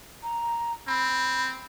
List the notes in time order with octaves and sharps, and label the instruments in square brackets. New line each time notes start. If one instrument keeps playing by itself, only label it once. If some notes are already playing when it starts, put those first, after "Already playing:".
[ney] A#5
[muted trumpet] C4 [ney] B5